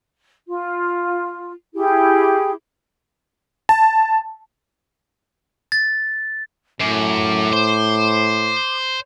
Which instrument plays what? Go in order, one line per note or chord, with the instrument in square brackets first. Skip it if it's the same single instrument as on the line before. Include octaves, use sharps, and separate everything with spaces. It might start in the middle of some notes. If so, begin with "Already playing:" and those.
[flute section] F4
E4 G4 G#4
[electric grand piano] A5
[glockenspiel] A6
[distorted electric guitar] F#2 [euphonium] A2 [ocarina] D6
[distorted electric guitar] C5